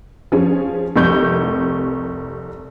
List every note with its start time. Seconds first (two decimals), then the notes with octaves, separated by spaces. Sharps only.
0.32 F3 C#4 G#4
0.96 F1 C2 C#6 G6